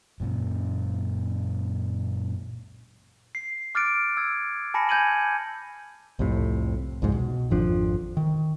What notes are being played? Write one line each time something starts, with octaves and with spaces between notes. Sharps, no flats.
F#2 A#2 C#3
C7
D6 F6 F#6 A6 C#7 D7
E6 G#6
G#5 A5 B5 A#6 C#7
G#5 G6 G#6 D#7 F#7
C2 F2 A2 C3
C2 F2 G#2 G#3
B2
G#1 F2 F3 D4
D#3